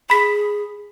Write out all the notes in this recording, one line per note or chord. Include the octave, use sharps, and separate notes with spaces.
G#4 B5 B6